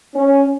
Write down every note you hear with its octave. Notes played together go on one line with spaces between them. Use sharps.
C#4